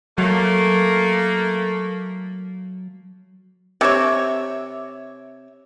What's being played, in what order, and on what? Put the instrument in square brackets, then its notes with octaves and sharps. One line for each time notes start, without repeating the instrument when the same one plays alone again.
[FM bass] F#3 [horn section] A3 A#3
[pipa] C3 C#5 [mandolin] E5 D6